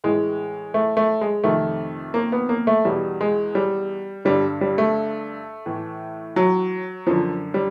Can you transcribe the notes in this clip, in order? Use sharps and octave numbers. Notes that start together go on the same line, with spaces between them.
A2 E3 G#3
A3
A3
G#3
F2 C3 D#3 A3
A#3
B3
A#3
A3
E2 B2 G3
G#3
G3
G2 D3 G3
G3
A3
A2 E3
F#3
F#2 D3 F3
G3